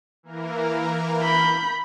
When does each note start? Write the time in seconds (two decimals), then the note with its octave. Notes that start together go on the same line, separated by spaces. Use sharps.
0.23 E3 A#3 A#4
1.22 B5 G6